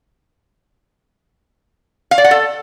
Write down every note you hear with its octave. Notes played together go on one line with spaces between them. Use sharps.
F5
D5
F#5
A4